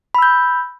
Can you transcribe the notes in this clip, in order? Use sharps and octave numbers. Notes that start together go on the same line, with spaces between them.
B5 E6 G6